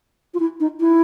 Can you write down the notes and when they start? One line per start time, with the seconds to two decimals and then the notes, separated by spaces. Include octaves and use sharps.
0.34 F4
0.40 E4
0.60 D#4
0.80 E4